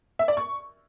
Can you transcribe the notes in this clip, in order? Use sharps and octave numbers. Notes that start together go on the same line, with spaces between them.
E5
D5
C#6